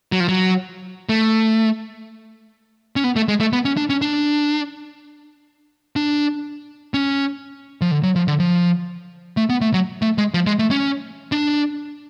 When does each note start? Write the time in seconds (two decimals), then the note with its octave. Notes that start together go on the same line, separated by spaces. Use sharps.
0.12 F#3
0.20 F3
0.29 F#3
1.09 A3
2.96 C#4
3.04 B3
3.16 A3
3.28 G#3
3.40 A3
3.53 B3
3.65 C#4
3.77 D4
3.90 C#4
4.02 D4
5.96 D4
6.94 C#4
7.81 F3
7.91 D3
8.03 F#3
8.16 F3
8.28 D3
8.40 F3
9.37 A3
9.49 B3
9.61 A3
9.73 F#3
10.02 A3
10.18 G#3
10.34 F3
10.47 G#3
10.59 A3
10.71 C#4
11.32 D4